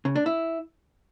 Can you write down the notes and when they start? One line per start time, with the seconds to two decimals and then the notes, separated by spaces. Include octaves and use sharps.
0.05 C#3
0.16 D4
0.26 E4